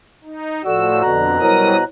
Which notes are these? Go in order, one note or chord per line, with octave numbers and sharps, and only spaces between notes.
D#4
A2 F3 F#4 A4 D5 E6
F2 B2 D3 A#5 F#6
F#3 G3 E4 A#4 C5 C#5 D#6